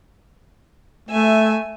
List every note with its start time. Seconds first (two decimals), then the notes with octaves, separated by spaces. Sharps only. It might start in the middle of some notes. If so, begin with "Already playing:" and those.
1.09 A3 E5 G#5